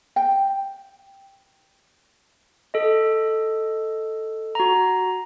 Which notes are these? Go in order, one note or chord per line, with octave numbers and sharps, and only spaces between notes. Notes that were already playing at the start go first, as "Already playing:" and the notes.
G5
A4 D#5
F#4 A#5